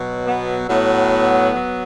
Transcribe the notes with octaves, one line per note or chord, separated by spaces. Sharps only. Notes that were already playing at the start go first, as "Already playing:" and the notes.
Already playing: B2 F#3
B3
A2 F#3 B3
F#3